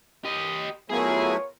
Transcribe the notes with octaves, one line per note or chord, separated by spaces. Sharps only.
G4 D#5
F#3 A3 B3 E4 F4 G#4 A#4 C#5